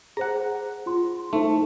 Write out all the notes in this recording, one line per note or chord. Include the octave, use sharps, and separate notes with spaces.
G#4 C5 F#5 A#5
F4 C6
A3 D#4 E4 C5